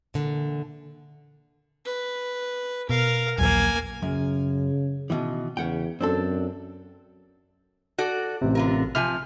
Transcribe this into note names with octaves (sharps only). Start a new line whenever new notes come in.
A#2 D3 E3
B4
B2 A#4 F5
A#1 D#2 F#3 A#3 G#5
F#2 C#3
B2 D#3 E3
E2 C#3 F#5 G5
F#2 C4 D4 A4
F#4 A4 D5
A1 C3
D3 F4 A#4
C3 F3 G#5 F6